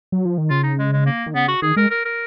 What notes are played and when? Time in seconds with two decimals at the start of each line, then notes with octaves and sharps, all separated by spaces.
0.12 F#3
0.25 F3
0.38 D#3
0.50 C#3 F4
0.63 D#4
0.78 G#3
0.92 G#3
1.06 A#3
1.26 D#3
1.34 C#3 B3
1.48 F#4
1.62 D#3 G#4
1.76 G#3 A#4
1.90 A#4
2.05 A#4